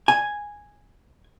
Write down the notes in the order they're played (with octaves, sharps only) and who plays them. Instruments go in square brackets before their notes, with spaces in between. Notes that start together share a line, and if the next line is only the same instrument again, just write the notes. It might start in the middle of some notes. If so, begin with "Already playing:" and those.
[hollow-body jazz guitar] G#5